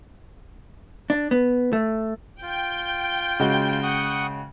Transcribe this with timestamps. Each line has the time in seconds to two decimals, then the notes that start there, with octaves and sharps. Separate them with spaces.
1.10 D4
1.31 B3
1.73 A3
2.42 F4 G5 G6
3.40 C#3 G#3 F#4
3.83 F#5 C#6 D#6